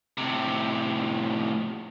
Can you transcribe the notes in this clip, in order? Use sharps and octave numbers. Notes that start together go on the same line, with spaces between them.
A2 C3